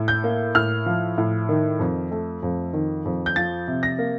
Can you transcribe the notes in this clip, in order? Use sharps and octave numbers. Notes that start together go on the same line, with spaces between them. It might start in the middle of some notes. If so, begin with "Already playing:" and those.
Already playing: A2
G6
A#3
A2 F6
F3
A2
D#3
F2
A3
F2
D#3
F2
G6
F3 A6
C3
A#6
A#3